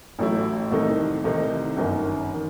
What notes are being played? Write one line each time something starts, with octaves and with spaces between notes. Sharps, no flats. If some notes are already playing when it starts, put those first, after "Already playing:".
A1 A2 F#3 A3 E4
C2 C3 D#3 A3 D#4
C2 C3 D#3 A3 D#4
G1 F#2 D#3
D#3